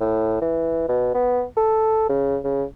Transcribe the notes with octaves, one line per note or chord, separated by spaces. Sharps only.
A2
E3
B2
B3
A4
C#3
C#3